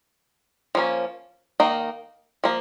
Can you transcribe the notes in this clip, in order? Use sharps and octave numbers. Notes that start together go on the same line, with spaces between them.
F3 A#3 C#4
D#3 A#3 D#4
F3 A#3